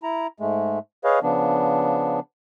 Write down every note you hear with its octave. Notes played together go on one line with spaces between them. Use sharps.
E4 A#5
G#2 G#3 A3
G#4 B4 C#5 D#5 F5
C#3 F3 B3 D4